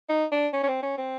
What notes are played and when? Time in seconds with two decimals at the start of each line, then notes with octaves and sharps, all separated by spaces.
0.09 D#4
0.32 D4
0.53 C#4
0.63 C#4
0.68 C4
0.83 C#4
0.98 C4